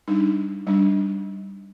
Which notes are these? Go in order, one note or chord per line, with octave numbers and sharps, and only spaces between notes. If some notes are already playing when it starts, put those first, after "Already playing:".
G3 D4 D#4
G3 D4